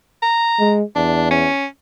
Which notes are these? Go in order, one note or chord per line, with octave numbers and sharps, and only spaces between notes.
A#5
G#3
E2 D4
C#4